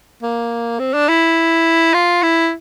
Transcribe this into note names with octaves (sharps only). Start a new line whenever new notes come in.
A#3
C4
D4
E4
F4
E4